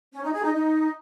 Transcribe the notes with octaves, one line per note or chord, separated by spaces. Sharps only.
C#4
D#4
G#4
D#4
D#4